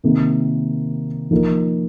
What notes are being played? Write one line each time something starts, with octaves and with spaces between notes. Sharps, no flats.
C3 D#3 A#3
F3 A#3 D#4 A#4